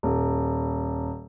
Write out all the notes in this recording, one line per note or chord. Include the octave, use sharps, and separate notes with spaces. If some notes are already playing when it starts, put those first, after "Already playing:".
D#1